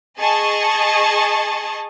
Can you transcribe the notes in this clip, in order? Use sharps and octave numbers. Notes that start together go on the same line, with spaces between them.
G#4 D#5 A5 C#6